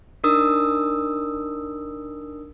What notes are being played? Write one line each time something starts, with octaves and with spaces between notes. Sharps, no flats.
D4 D#4 A#4 D#6 E6